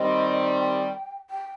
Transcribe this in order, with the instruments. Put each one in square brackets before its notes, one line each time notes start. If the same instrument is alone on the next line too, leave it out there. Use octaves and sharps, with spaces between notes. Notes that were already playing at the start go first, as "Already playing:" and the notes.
Already playing: [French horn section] D#3 G3 C4 [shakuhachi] D#5
[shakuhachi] G5
G5